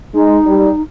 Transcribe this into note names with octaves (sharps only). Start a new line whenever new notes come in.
G#3 D#4
G3